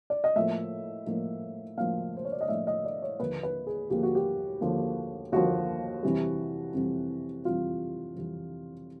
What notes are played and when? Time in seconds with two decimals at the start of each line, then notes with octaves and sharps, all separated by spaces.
0.10 D5
0.24 D#5
0.36 A2 F3 A#3 E5
1.06 A2 F3 A#3
1.77 A2 F3 A#3 F5
2.17 C5
2.25 C#5
2.32 D5
2.41 D#5
2.48 A2 F3 A#3 E5
2.67 D#5
2.85 D5
3.02 C#5
3.19 D#2 D3 F3 A#3 B4
3.43 B4
3.67 G#4
3.90 D#2 D3 F3 A#3 G4
4.03 F#4
4.15 G4
4.61 D#2 D3 F3 A#3
5.32 D#2 D3 F3 A#3 F#4
6.03 F2 C3 E3 G3
6.74 F2 C3 E3 G3
7.45 F2 C3 E3 G3 F4
8.16 F2 C3 E3 G3